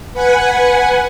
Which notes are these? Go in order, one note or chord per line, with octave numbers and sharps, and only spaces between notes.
B4 F#5 G#5